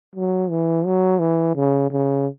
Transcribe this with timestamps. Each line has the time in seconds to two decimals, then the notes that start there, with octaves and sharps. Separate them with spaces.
0.15 F#3
0.50 E3
0.86 F#3
1.20 E3
1.56 C#3
1.91 C#3